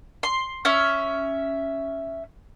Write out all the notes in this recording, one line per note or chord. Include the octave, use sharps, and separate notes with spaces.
C6
C#4 E5